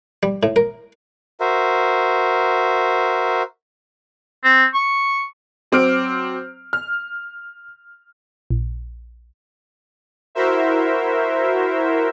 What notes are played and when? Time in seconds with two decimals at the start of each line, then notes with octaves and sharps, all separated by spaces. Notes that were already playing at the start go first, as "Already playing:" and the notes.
0.23 G3
0.43 A2
0.56 A#4
1.40 F#4 A#4 C5 E5
4.44 C4
4.74 C#6
5.72 F#3 C4 D6 F6 D7
6.73 F6
8.50 A#1
10.35 E4 F#4 A#4 C5 E5